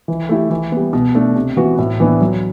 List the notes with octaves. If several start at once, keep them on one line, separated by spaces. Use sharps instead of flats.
E3
A3 E4 G4
E3
G3 B3
B2
A3 D4
C3
E3 B3 F#4
A2
E3 B3 D4
F#3